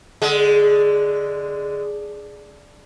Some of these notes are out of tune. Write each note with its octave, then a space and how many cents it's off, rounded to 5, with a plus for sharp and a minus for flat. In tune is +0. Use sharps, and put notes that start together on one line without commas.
D3 +0 G#3 +0 A4 -45